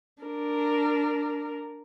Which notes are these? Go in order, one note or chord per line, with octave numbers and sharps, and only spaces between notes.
D4 A#4